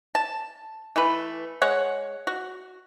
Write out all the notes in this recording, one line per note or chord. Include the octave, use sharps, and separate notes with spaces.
A5
E3 A3 B4
G#3 C#5 F#5
F#4